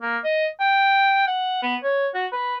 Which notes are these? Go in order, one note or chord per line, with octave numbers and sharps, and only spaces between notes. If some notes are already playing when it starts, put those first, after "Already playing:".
A#3
D#5
G5
F#5
B3
C#5
F#4
B4